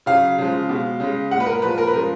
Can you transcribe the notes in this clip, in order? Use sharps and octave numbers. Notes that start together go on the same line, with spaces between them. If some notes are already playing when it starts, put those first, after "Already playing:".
C#3 F#3 F5
C#3 F3 G#3
B2 G#3
C#3 G#3
A#2 G#3 F#5
B4
A#4
A#2 F3 G#3 B4
A#4
B4
C#3 F3 G#3 A#4